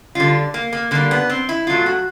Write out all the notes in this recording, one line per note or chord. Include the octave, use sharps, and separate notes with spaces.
D3 G3 F4
A#3
A#3
D3 G3 A#3
B3
C4
E4
B2 F#3 A3 F4
F#4